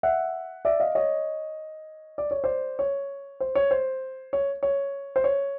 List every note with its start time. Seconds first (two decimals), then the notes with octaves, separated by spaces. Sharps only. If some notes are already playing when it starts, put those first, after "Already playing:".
0.03 E5 F#5
0.65 D5 E5
0.80 D#5 F5
0.95 C#5 D#5
2.18 D5
2.31 C#5
2.44 C5 D5
2.79 C#5
3.40 C5
3.55 C#5
3.71 C5
4.33 C#5
4.63 C#5
5.16 C5
5.24 C#5